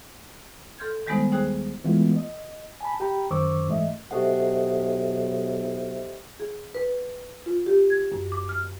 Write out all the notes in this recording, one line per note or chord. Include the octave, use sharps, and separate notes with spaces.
A4 C6 F6 G6 G#6
D#3 G3 G#3 B3 D#4 C5
D#2 D#4 G#4 C5 F#6
E3 G#3 A3 B3 F4
D#5
G#5 A5 B5
G4 G5 A#5 B5
F#2 D#3 C5 C#6 D6 E6
A1 G#2 E3 A3 D#5 E5
B1 G4 A4 C5 D#5 E5 F#5
G#4
B4
F4
G4
G#6
F#2
D6
F6